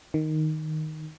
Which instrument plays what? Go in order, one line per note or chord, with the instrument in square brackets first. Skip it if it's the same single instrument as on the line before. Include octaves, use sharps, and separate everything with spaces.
[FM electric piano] D#3